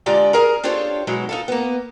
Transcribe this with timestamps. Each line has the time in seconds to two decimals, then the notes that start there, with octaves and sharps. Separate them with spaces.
0.06 D3 G#3 F4 G4 D5 A#5
0.33 G#4 A#4 A#5
0.64 D4 F4 G4 A4 C5 C#5
1.07 B2 F#3 G#3 D#4 E4
1.29 D#4 F4 A4
1.48 A#3 B3